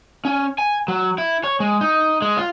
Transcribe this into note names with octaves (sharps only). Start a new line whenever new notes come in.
C#4
G#5
F#3
E4
C#5
G#3
D#4
G#3
F4